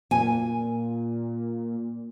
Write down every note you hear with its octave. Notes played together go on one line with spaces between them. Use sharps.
A#2 G#5